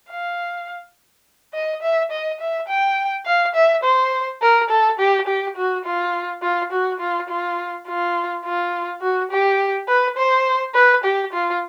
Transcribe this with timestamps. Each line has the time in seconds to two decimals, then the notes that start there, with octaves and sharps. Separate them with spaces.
0.10 F5
1.54 D#5
1.82 E5
2.11 D#5
2.40 E5
2.68 G5
3.26 F5
3.55 E5
3.83 C5
4.42 A#4
4.70 A4
4.99 G4
5.27 G4
5.56 F#4
5.85 F4
6.42 F4
6.72 F#4
7.00 F4
7.29 F4
7.87 F4
8.45 F4
9.01 F#4
9.31 G4
9.88 B4
10.17 C5
10.74 B4
11.04 G4
11.33 F4